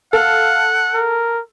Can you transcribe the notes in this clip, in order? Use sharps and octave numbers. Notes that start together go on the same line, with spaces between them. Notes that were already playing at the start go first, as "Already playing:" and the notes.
A4 F5 F#5
A#4